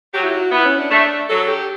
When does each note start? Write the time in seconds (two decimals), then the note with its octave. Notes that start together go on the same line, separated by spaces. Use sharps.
0.14 F#3 G4
0.24 E4
0.33 F#4
0.52 B3 E4
0.65 C#4
0.78 D4
0.90 A3
1.29 F#3 A4
1.48 G4